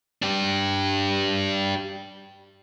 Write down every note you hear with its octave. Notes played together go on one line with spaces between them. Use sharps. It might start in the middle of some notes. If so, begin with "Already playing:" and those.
D4 G4